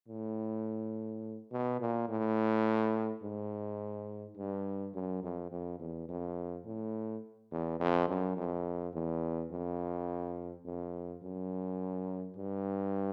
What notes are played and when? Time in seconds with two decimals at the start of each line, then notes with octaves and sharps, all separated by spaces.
0.09 A2
1.52 B2
1.80 A#2
2.09 A2
3.23 G#2
4.37 G2
4.94 F#2
5.23 F2
5.52 F2
5.80 E2
6.09 F2
6.66 A2
7.52 E2
7.80 F2
8.08 F#2
8.37 F2
8.94 E2
9.51 F2
10.65 F2
11.23 F#2
12.37 G2